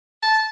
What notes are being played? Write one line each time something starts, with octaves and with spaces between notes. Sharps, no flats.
A5